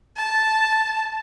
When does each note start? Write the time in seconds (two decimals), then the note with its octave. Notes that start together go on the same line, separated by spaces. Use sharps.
0.17 A5